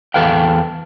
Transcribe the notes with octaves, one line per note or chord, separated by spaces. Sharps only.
E2 A4 B4 F5 G5